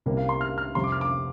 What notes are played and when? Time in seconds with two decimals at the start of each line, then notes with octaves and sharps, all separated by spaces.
0.06 C2 C3 G3 A#3
0.17 F5
0.29 C6
0.41 F6
0.58 F6
0.75 F2 C3 G3 C6
0.84 D6
0.92 F6
1.01 D6